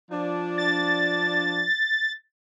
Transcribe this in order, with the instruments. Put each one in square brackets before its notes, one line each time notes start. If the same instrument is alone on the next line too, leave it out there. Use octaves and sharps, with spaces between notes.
[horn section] F3 D4
[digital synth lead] A6